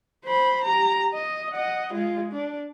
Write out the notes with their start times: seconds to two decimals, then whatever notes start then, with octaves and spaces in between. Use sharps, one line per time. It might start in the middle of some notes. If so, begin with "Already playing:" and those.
0.24 C5 B5
0.64 G4 A#5
1.13 D#5
1.53 D#5 F#5
1.93 G#3 F4
2.32 D4